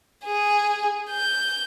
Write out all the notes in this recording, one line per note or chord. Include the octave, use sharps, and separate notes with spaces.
G#4
G6